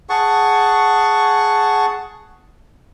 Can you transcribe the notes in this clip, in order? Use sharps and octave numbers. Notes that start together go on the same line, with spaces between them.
G#4 F#5 A5 C#6